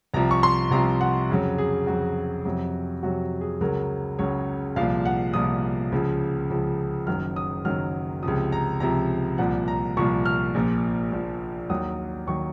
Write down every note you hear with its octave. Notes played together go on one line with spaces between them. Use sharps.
C2 C3 F3 A#5
C#6
C6
C2 C3 F3 A#5
F#5
F2 C#3 F#3
G#4
F2 C#3 F#3 F#4
F2 C3 F#3
F2 C3 F#3 F#4
G#4
C#2 C#3 F#3 A#4
C#2 C#3 F#3 C#5
C2 A#2 F3 F5
F#5
C2 A#2 F3 D#6
C#2 C#3 F3
C#2 C#3 F3
F#1 F#2 D#3 F#3 F6
D#6
F#1 F#2 D#3 F#3 F6
C#2 C3 F3 D#6
A#5
C#2 C3 F3 A#5
C2 A#2 F3 F#5
A#5
C2 A#2 F3 C#6
F6
A#1 A#2 F3
A#1 A#2 F3
D#2 D#3 F#3 D#6
D#2 D#3 F#3 C#6